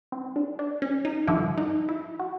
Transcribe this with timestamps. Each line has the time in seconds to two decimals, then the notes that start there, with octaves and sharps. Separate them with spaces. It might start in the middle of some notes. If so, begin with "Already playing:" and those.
0.12 C4
0.36 D4
0.59 D4
0.82 C#4
1.05 D#4
1.27 G#1 G2 D3 F3 E4
1.58 D#4
1.89 E4
2.19 F#4